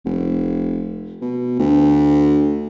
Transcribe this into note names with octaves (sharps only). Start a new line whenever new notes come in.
F1
B2
D2